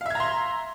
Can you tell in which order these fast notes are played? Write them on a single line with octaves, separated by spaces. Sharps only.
F5 E5 G#6 A#5 C6